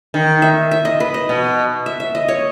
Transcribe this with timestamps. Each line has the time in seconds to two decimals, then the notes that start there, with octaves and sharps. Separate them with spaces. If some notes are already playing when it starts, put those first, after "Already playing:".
0.14 D#3
0.42 E5
0.71 E5
0.85 D#5
1.00 B4
1.14 D#5
1.29 B2
1.86 E5
2.00 E5
2.15 D#5
2.28 C#5